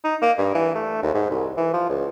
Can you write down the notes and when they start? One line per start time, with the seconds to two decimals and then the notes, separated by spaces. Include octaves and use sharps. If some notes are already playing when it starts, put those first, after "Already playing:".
0.04 D#4
0.22 A#3
0.38 G2
0.54 E3
0.75 A3
1.03 D#2
1.15 G#2
1.30 C2
1.57 E3
1.73 F3
1.89 C#2